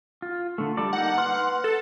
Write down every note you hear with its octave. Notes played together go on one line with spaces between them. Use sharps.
F4
D3 A3
G3 A4 D5
A#3 D#4 F#5
B4 C6 F6
A4